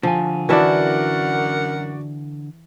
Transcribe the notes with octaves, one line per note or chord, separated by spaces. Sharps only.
D3 F3 G#5
F#2 E3 D4 F#4 A#4 D5 E5 F#5